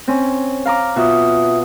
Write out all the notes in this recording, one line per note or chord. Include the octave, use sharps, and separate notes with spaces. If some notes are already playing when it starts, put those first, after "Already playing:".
C4 C#4
F5 A#5 D6
B2 F4 E5 D#6